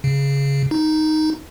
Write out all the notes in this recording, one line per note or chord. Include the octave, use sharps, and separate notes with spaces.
C#3
D#4